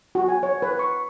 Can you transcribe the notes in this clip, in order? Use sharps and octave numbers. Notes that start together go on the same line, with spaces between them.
F#4
G#5
C#5
B4
C#6